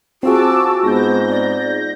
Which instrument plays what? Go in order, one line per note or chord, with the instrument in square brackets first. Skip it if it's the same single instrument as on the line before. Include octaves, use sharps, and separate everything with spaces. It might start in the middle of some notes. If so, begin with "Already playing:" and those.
[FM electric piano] C4 F4 G#4 [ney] F#4 [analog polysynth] A5 D6 E6
[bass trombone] G#2 [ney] B3 [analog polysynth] G6 A#6
[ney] D5